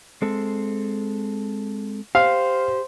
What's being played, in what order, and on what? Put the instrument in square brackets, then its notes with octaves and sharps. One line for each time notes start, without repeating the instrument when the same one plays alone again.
[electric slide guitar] G#3 C4 A4
[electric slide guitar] G4 [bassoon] C5 [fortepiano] F5